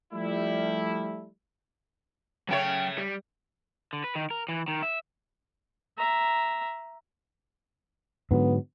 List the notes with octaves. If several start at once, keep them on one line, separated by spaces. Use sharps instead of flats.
F3 G3 A3 E4
C#3 F#3 A3 C#5 G5
G3
D3
B4
D#3
A#4
E3
D#3
E5
E5 A#5
G#2 D3 F#3 B3